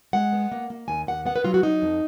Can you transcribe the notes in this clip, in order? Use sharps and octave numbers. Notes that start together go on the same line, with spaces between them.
G#3 F#5
B3
A#3
A#3
D#2 G#5
D#2 F#5
B3 F#5
B4
F#3 F4
F#4
F#3 D#4
F2